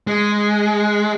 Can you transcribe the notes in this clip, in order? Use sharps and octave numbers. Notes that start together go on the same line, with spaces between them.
G#3